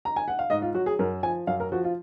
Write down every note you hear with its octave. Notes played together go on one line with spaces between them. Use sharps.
A#5
G#5
F#5
F5
G#2 D#5
F4
F#3 F#4
G#4
F#2 A#4
F3 G#5
F#2 F5
A#4
F3 F#4
F4